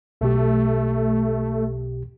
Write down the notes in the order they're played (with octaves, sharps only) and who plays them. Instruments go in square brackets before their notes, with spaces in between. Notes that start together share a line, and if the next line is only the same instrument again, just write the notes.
[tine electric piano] B1 B2 G4 [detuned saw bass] A3